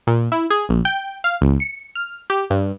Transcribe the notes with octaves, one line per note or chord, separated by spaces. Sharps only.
A#2
E4
G#4
A#1
G5
F5
C#2
C#7
F6
G4
G2